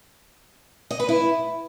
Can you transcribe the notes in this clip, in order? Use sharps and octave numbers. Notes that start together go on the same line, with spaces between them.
D#5
B4
E4